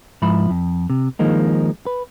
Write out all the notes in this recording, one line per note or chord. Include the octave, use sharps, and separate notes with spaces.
G#2 F3 E4 B5
F2
C3
D#3 F3 G#3 A#3 D#4
B4